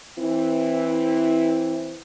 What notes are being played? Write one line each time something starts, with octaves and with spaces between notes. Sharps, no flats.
E3 C4 E4